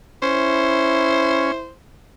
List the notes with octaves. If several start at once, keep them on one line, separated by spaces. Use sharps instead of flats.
C#4 E4 C5